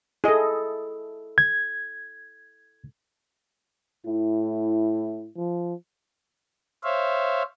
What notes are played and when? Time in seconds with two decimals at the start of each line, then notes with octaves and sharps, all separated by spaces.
0.24 E4 G#4 A4 D#5
1.38 G#6
4.06 A2 E4
5.36 F3
6.84 C5 C#5 E5 F5